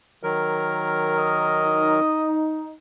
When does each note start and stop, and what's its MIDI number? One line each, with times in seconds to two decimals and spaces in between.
0.23 2.00 51
0.23 2.00 54
0.23 2.00 70
1.17 2.38 75
1.65 2.73 63